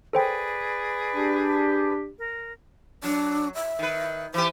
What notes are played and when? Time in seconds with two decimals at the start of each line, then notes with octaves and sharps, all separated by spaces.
0.13 G#4 A4 B4 C5 D5 G5
1.15 D4 G4
2.18 A#4
3.04 F#3 D4
3.55 E5
3.79 D#3 B4
4.34 E3 G4 C5